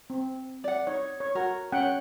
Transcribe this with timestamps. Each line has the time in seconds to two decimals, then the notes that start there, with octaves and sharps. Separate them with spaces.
0.10 C4
0.64 D5 F#5
0.87 D#4 C#5
1.20 C#5
1.35 F#4 A#4
1.72 C#4 F#5 G5